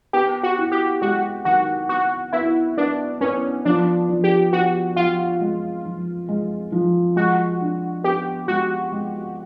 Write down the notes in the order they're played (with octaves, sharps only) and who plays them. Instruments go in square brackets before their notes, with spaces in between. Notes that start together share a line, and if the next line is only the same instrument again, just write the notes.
[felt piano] B3 [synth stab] G4
[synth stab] F#4
[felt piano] E4
[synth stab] G4
[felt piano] G#3 [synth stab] F#4
[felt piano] D#3 [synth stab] F#4
[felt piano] B3 [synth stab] F#4
[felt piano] B3 [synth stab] E4
[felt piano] B3 [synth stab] D4
[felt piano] B3 [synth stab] C#4
[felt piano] F3 [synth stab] D4
[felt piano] F3
[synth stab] G4
[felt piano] B3 [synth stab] F#4
[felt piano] F3 [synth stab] F4
[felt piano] G#3
F3
G#3
F3
[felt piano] G#3 [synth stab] F#4
[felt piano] D4
[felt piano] B3 [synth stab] G4
[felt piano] G#3 [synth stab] F#4
[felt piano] G#3